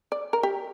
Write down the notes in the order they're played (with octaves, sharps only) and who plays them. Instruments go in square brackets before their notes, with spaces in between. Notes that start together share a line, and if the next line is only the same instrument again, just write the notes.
[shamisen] D5
A#4
G4